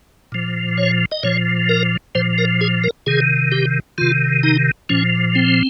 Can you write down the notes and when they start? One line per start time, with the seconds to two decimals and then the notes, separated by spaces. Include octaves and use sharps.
0.32 A#2 F3
0.78 C#5
1.12 D#5
1.23 A#2 F3 C#5
1.69 A#4
2.15 A#2 F3 C5
2.38 A#4
2.61 G#4
2.84 A#4
3.07 C3 D#3 G#4
3.52 G4
3.98 C3 D#3 F4
4.43 D#4
4.89 A#2 F3 C#4
5.35 C4